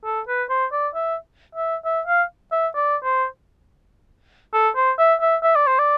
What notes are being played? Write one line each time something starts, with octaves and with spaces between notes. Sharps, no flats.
A4
B4
C5
D5
E5
E5
E5
F5
E5
D5
C5
A4
C5
E5
E5
E5
D5
C5
D5